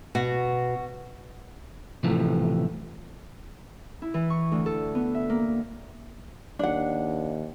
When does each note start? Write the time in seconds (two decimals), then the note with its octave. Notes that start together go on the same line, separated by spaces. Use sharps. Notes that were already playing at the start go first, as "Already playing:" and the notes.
0.15 B2 F#4
2.03 A2 C3 E3 F3
4.02 E4
4.14 E3
4.30 C#6
4.52 D2
4.66 A4
4.95 B3
5.15 E5
5.30 A#3
6.59 D#2 D4 F#5